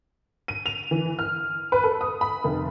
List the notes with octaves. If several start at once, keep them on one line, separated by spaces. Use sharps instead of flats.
D#7
F7
E3
F6
B4
A4
D#6
B5
F1